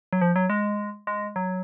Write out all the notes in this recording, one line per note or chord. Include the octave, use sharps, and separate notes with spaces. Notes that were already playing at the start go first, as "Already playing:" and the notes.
F#3
F3
F#3
G#3
G#3
F#3